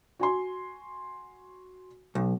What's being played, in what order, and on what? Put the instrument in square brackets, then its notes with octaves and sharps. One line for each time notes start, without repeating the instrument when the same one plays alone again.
[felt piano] F#4 G#5 C6
[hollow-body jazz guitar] B1